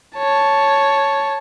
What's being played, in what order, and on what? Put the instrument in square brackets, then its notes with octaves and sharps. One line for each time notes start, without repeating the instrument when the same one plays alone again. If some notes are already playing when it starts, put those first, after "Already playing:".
[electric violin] C#5 A5